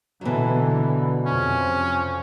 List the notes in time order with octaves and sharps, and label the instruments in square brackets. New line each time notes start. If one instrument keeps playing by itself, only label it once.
[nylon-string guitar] B2 F#3 [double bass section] D3 E3
[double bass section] F2 C3 F3 [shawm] C#4